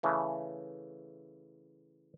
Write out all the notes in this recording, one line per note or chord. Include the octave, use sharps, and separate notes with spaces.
C#3 E3 A3